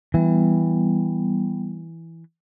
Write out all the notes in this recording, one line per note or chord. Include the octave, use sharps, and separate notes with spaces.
E3 G3 B3